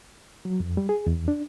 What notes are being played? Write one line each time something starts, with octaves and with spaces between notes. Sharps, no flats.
F#3
F2
G3
G#4
E2
D4